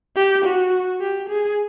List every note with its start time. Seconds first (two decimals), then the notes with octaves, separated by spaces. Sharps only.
0.16 G4
0.44 F#4
1.01 G4
1.29 G#4